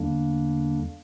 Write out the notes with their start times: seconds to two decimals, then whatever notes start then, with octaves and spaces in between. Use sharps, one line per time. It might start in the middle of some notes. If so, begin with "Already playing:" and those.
Already playing: E2 D3 G3 A#3 D4